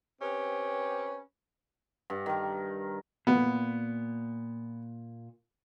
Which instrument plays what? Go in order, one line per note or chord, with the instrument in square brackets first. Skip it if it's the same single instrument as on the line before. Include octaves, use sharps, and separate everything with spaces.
[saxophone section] C4 C#4 G4 B4
[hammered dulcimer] G2
D#3 A#4
[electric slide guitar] A#2 [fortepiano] B3